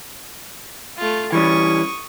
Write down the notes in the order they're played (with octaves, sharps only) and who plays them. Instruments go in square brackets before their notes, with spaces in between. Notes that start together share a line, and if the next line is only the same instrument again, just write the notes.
[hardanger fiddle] A3 F4
[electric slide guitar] E3 G3 C#4 [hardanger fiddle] C#6 D#6